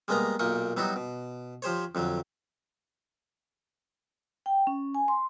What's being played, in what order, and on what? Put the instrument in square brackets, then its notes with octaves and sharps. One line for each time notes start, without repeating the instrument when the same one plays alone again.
[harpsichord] G3 G#3 A#3 B3 D#5 A#5
B1 A#2 A#3 G5 C#6 D#6
F#3 G3 B3 D#4 E4 F#4
B2
F3 G4 C5 C#5
F2 D3 F#3
[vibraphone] G5
C#4
G#5
C6